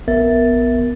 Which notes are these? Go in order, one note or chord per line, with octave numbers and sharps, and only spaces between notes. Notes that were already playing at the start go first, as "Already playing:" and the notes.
A#1 B3 A#4 E5 A6